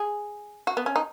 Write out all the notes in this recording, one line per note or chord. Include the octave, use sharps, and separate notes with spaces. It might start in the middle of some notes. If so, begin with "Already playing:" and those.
Already playing: G#4
F#4
B3
C#4
D#4